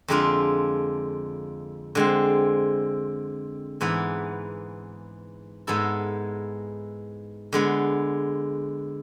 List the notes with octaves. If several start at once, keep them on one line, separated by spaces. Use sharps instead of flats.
F2 D3 G#3 D4 F4
D3 G#3 C4
G#2 E3 B3 E4
G#2 G#3 B3 E4 A4
D3 G#3 B3